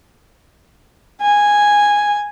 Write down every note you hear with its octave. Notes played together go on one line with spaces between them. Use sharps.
G#5